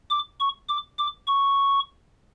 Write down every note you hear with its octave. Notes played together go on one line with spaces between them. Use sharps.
D6
C#6
D6
D6
C#6